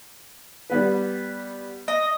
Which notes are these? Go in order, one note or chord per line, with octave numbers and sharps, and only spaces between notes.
G3 B3 B4
D#5